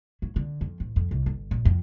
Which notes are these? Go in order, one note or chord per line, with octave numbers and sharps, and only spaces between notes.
F#3
D3
F2
A1
F2
C2
G1
A#1
F2